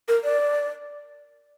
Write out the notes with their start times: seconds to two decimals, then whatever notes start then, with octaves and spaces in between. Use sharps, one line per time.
0.08 A#4
0.24 D5